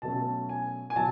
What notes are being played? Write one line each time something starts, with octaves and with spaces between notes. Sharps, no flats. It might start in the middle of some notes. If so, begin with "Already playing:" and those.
B2 F#3 A3 C#4 A5
G#5
G#5
B2 F#3 A5